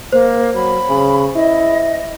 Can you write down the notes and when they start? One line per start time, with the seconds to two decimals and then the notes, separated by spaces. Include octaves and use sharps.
0.13 A#3 C5
0.55 F#3 B5
0.89 C#3
1.36 E4 D#5